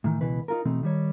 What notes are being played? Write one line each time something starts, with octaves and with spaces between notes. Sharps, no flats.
A2 D#3 E3
C#2 B2 E3 B4
D#4 F4 A#4
B2 E3 A3 C4 D#4
D#3 G3 C#5